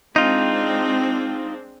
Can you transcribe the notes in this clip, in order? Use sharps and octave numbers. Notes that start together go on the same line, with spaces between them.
G#3 C4 D4 D#4 F4